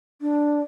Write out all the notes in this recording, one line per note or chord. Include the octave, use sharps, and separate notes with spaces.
D4